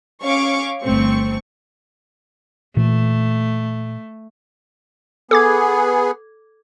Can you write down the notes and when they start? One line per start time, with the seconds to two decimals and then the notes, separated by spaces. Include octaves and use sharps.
0.23 C#4 F5 C#6 D6
0.82 G1 A3 C4 C#6
2.77 A#2 E3 A3
5.31 B3 G#4 A4 D6 G#6